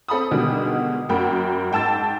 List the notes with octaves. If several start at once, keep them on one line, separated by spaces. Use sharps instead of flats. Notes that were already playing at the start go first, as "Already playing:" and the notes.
C4 A4 B5 D#6
B2 D3 D#3 G3 G#3
F#2 A#3 F#5 G5 B5
G#2 G5 A5 E6 A6